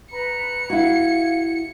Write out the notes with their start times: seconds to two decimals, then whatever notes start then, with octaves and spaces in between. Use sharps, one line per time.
0.11 B4 A#5 B5 C#7
0.70 E4 F#4 F5 G#6